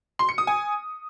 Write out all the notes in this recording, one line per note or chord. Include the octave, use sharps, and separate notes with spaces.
C6
C#7
D#6
G#5